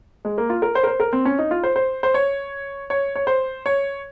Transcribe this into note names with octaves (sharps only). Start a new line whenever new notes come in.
G#3
A#3
F4
A#4
C5
A#4
C5
A#4
C4
C#4
D#4
F4
C5
C5
C5
C#5
C#5
C#5
C5
C#5